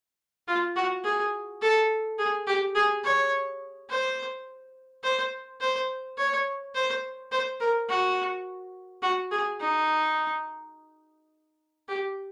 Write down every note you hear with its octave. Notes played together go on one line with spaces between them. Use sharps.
F4
F#4
G#4
A4
G#4
G4
G#4
C#5
C5
C5
C5
C#5
C5
C5
A#4
F#4
F#4
G#4
D#4
G4